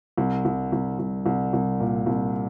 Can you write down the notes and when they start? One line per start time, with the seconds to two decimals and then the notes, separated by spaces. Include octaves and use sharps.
0.18 C2
0.45 C2
0.72 C2
0.99 C2
1.26 C2
1.53 C2
1.80 A#2
2.06 C2